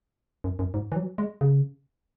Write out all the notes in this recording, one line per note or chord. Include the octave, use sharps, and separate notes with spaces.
F#2
F#2
G#2
E3
F#3
G#3
C#3